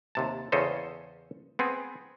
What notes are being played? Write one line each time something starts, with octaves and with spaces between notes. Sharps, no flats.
D#2 C3 A5
E2 C#3 C#4 A4 C5 D#5
B3 C4 G#4